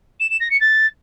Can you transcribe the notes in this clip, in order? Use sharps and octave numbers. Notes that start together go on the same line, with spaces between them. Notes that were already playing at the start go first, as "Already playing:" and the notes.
E7
E7
A#6
C#7
A6